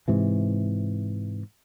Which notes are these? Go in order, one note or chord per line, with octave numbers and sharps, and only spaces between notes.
G#2 C3 E3